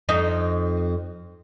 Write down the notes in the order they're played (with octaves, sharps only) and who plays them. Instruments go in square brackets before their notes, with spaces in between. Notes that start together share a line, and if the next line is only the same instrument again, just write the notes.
[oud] F2 D#4